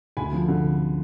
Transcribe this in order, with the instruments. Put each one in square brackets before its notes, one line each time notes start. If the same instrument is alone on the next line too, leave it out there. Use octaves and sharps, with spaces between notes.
[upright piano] D2 G#5 B5
F3
D3